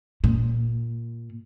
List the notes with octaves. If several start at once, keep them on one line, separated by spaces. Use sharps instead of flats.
A#2